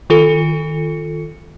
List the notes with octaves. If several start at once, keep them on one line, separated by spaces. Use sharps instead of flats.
D#3 F4 A4 C#7